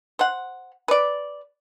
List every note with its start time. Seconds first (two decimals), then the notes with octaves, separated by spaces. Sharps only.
0.19 C5 F#5
0.88 B4 D5